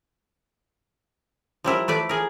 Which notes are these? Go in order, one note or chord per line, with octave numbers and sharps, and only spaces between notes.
F3 G3 E4 A#4
A3 B4 D5
G#4 A#4